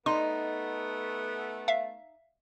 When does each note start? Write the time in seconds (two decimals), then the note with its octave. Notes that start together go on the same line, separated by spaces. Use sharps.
0.06 A3 B3 D#4 C6
1.68 E5 F5